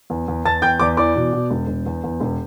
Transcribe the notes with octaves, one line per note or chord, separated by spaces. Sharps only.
E2
E2
E2 A5 A6
E2 G5 G6
E2 D5 D6
E3 D5 D6
B2
B2
E1
E1
E2
E2
E1